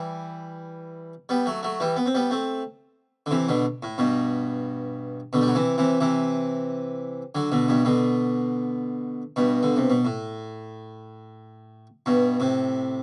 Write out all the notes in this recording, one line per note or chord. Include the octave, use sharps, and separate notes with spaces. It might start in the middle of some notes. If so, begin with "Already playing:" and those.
Already playing: E3 G3
G3 B3
F#3 A3
F#3 A3
E3 G3
B3
C4
G3 B3
A3 C4
D3
C3 E3
B2 D3
A2
G2 B2
B2 D3
G3
F#3
C3 E3
C3 E3
C3 E3
D3 F#3
B2 D3
G2 B2
B2 D3
G2 B2
D3
C3
B2
A2
G2 B2
A2 C3